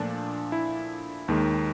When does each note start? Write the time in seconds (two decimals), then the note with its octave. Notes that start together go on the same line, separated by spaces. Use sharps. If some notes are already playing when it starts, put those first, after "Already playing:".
Already playing: A#2 F3 A3 D4
0.52 E4
1.28 D#2 D#3 G#3